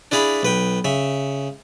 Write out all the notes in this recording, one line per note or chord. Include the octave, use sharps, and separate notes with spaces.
D4 E4 G#4 F5 B5
B1 B4 G5
C#3 E5